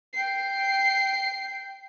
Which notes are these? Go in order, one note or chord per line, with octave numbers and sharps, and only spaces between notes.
G5 C7